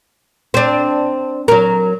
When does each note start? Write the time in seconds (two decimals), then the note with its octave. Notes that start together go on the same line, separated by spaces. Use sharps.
0.54 C4 D4
1.48 F#3 A#4